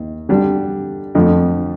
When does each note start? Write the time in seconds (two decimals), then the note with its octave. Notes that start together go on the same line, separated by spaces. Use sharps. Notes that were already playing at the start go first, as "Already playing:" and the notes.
Already playing: D#2
0.29 D3 G3 D4
1.15 F2 D3 F3 A3